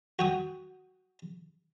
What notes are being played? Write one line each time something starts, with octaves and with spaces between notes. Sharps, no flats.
F#4 G5 D#6